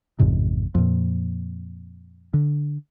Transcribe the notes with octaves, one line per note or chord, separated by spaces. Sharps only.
A1 F2 G#2 C3
F2 A#2
D3